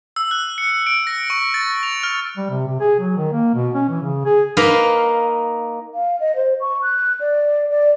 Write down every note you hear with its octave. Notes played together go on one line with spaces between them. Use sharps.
E6
F#6
C#7
D7
A#6
C#6
A6
F7
F6
G3
C3
C3
G#4
F#3
D#3
A#3
B2
C#4
E3
C#3
G#4
A#3 D#4 B4 D#5 F5
F5
D#5
C5
C#6
F#6
D5
D5